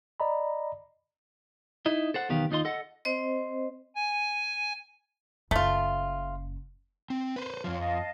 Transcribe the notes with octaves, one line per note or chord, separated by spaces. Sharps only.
D5 D#5 A#5 B5
D#4 E4 D#5
A4 C5 F#5
B1 E2 D#3 B3 G4 F5
D#2 D#4 F4 D#5 C6
A4 D#5 F#5
C4 C5 D#5
G#5
F#1 A3 F4
C4
B4 C5
F2 F3 F4 C#5 F6
D#5 F5 A5